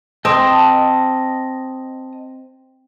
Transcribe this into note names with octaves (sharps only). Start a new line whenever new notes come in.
C4 D#5 A5 D#6